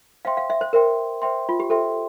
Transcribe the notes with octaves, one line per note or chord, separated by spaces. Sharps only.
C5 E5 F5 G5 C6
F5
E5
C5
A#4 C5 E5 G5 C6
C5 E5 G5 C6
F4
G4
A4 C5 E5 G5 C6